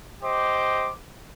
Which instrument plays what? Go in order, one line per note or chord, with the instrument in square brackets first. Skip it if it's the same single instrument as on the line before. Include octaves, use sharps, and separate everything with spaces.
[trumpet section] G4 C5 D#5 D6